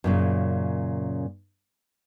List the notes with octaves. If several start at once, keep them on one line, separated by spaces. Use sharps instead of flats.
F#2 A#2 C#3